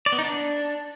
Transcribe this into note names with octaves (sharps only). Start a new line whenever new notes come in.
D5
B3
D#4
D4